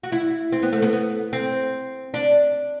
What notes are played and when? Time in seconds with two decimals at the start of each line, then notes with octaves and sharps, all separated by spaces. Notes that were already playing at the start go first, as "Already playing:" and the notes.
0.03 F#4
0.12 E4
0.52 C4
0.62 B3
0.73 A3
0.82 B3
0.93 B3
1.33 C4
2.14 D4